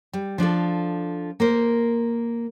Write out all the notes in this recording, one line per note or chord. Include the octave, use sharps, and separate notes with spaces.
G3
F3 D4 F4 A4
A#3 A#4 C5